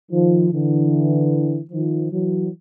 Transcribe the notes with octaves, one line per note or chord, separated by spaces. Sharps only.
D#3 F3
D3 E3
D#3 F3
E3 F#3